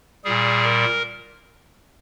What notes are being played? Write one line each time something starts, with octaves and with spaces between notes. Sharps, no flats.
A#2 G3 G#4
A#4